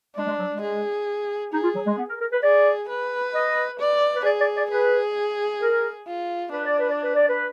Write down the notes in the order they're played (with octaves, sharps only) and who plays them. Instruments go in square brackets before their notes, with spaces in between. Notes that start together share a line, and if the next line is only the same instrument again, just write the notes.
[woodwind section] G#3 [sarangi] D4
[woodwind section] G#3
F#3
G#3
[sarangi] G#4
[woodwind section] D#4 [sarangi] G#4
[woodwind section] F4
F#3
G#3
B3
A#4
A#4
B4
[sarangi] G#4 [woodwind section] D5
[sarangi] B4
[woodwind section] D#5
[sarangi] D5
[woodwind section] B4
[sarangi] G#4 [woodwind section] D5
[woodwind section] D5
D5
[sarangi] G#4 [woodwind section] B4
[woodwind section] A#4
[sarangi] F4
[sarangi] D4 [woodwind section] B4
[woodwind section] D5
B4
D5
B4
D5
B4